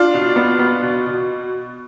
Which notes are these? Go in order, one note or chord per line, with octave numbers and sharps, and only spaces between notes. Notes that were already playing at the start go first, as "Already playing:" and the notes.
Already playing: D4 F4
B2
B3
B3
B2
B2